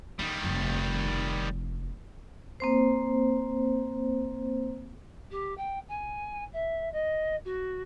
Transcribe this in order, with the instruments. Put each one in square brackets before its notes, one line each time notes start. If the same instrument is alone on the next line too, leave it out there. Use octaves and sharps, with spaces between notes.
[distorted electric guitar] D#3 G3 [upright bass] D#4
[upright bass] F1 F2
[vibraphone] A#3 C4 C5
[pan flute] G4
G5
G#5
E5
D#5
F#4